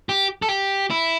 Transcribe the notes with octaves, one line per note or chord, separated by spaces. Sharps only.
G4
A4
G4
E4